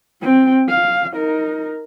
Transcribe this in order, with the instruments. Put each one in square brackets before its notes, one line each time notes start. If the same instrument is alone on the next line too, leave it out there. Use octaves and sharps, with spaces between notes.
[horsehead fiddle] C4 G5
F5
D#4 A#4